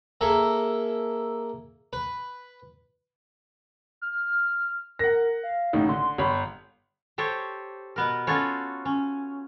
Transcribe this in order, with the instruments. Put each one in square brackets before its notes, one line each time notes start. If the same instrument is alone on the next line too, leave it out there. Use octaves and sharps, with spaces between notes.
[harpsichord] A#3 G#4 A4 E5
B4
[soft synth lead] F6
[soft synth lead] A#4 [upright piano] F#5 A#6
[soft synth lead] F5
[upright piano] A1 A2 [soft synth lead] D#4
[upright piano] D3 [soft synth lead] C6
[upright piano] G1 C#5 B5
[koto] G4 A4 C5 C#5
B2 B3 A#4
B3 C#4 F4 F#4 A4 C#5
C#4